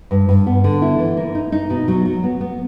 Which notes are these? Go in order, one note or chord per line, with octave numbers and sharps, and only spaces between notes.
G2
G2
B3
D3
E4
E3
A#3
D#4
D#4
B2
F#3
F#3
B3
B3